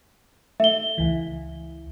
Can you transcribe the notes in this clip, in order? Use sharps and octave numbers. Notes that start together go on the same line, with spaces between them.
A3 E5 G7
C#2 E3